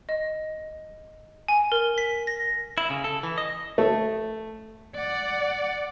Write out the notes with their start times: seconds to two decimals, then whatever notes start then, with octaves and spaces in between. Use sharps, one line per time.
0.09 D#5
1.48 G#5
1.72 A#4
1.98 B6
2.27 A#6
2.78 E4
2.90 C#3
3.04 A4
3.23 E3
3.38 D#5
3.78 A3
4.95 D5 F#5